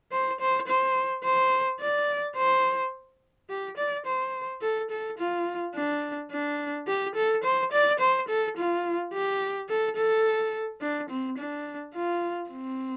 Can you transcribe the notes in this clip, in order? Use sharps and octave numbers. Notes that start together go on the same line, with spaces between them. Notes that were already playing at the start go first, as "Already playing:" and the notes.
C5
C5
C5
C5
D5
C5
G4
D5
C5
A4
A4
F4
D4
D4
G4
A4
C5
D5
C5
A4
F4
G4
A4
A4
D4
C4
D4
F4
C4